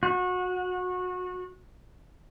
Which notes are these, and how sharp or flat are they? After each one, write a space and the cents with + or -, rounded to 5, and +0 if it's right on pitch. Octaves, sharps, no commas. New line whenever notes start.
F#4 -25